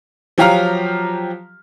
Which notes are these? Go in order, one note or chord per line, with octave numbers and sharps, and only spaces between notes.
F3 F#3 G4 F5 A#5 F6